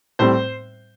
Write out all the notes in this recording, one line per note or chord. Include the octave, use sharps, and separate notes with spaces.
A2 G3 C4 C5